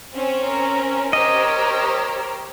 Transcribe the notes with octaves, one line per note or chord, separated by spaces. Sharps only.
C4 C#4
A#4
G4 A#4 C5 C#5 D#5